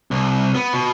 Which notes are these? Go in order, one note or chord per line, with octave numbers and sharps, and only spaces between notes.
C2
B3
B2